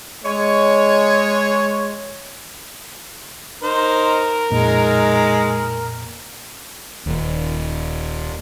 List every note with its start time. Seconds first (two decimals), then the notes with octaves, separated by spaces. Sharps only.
0.24 G#3 C#5
3.63 D#4 A#4 C5
4.51 F2 A#2 G#3 A#3 D#4
7.06 D#1 D#2